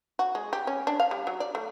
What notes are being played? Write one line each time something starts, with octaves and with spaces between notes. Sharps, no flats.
F#4
G#3
G4
C#4
D4
F5
G3
F#3
D5
A3